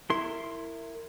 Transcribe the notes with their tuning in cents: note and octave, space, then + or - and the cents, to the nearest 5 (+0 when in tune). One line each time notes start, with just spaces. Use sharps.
E4 +5 A#4 -25 C6 +0